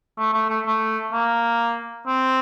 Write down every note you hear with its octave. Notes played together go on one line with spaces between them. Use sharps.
A3
A3
A3
A3
A#3
C4